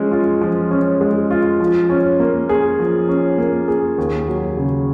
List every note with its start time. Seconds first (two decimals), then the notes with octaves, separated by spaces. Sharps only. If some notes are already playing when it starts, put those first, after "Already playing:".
Already playing: F3 G#3 C#4
0.12 F4
0.41 F3
0.71 C#4
1.01 G#3
1.31 F4
1.60 F3
1.89 C#4
2.20 A#3
2.49 G#4
2.79 F3
3.09 C#4
3.38 A#3
3.68 G#4
3.98 D#2
4.27 F#3
4.57 C#3